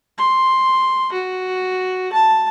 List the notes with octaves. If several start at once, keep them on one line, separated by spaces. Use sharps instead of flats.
C6
F#4
A5